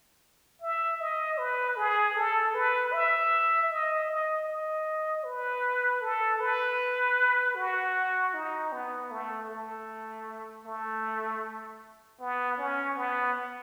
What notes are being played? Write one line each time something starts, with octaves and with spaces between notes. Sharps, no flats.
E5
D#5
B4
G#4
A4
B4
E5
D#5
D#5
D#5
B4
A4
B4
F#4
D#4
B3
A3
A3
A3
B3
C#4
B3